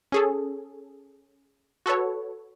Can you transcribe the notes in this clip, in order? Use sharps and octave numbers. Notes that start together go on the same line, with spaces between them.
C#4 G#4 A4
F#4 A4 B4 C#5